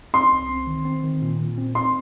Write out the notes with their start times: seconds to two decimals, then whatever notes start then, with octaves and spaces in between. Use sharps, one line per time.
0.14 C4 C6
0.31 C2
0.49 C4
0.67 D#3
0.85 C4
1.04 D#3
1.22 A#2
1.40 A#2
1.58 C4
1.75 C4 C6